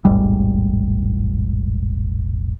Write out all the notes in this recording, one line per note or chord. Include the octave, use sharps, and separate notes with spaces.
E1 A1 G#2 G3